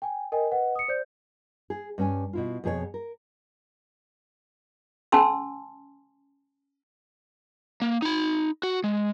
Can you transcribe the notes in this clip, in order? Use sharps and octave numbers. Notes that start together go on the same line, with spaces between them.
G5 G#5
A#4 D#5 G5 G#5
B4 D#5 F#5
D#6 C#7
C5 D5 G6
G#4
G2 C#4 G#5
B2 E4 F4
F2 B2 G#4 A4 C#5
A#4
C#4 G#5 A5 C6 E6
A#3
D#4 B5
F#4
G#3